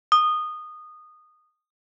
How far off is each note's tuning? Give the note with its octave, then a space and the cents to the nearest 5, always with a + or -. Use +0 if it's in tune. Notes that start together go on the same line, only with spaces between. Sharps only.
D#6 -15